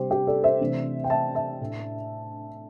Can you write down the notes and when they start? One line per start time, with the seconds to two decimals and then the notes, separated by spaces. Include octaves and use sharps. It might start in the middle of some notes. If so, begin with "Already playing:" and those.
Already playing: C3 G3 D4 G4 C5
0.11 G4
0.27 A4 D5
0.43 C5 E5
0.60 C3 E3 A3 D4
1.04 G5
1.10 E5 A5
1.35 E5 A5
1.61 A2 A3 D4